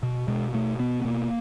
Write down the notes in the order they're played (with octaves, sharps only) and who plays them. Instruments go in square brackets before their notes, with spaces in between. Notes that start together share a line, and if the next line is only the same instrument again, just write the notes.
[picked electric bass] B2
B2 G#3
B2 A3
B2 B3
B3
B2 A#3